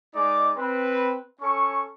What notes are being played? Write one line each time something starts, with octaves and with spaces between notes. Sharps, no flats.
G#3 D#4 D5 D6
C4 B4
C#4 A4 C#6